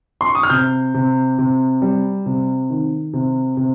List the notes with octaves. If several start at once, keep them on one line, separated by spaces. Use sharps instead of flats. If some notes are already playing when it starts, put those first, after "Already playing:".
C6
C#6
D#6
F6
C3 G6
C3
C3
G3
C3
D#3
C3
C3